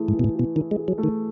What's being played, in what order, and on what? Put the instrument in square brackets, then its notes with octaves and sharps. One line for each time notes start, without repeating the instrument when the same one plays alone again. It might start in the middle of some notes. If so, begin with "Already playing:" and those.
Already playing: [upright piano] E3 A3 E4 G#4
[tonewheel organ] G#2
[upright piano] E3
[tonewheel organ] B2
A2
[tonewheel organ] B2 [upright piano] E3
[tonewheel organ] D#3 [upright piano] E4
[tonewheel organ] G#3
[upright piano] G#4
[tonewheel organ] F#3
[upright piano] A3
[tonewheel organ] D#3